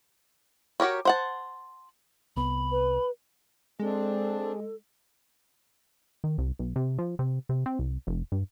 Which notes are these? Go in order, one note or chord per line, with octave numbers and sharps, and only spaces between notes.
F#4 G4 A#4 C#5
C5 F#5 A5
C2 B3 B5
B4
G#3 C4 D4 G#4 A4
D#3
C2
B1
C3
F3
C3
C3
C4
C2
F1
G2